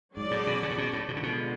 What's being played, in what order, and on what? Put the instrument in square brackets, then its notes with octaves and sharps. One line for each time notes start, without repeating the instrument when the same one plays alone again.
[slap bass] G#2 [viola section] F#3 C#4 G#4 D5
[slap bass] A2
B2
C#3
A2
B2
A2
[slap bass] B2 [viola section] D3 F3 G#3
[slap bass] C#3
B2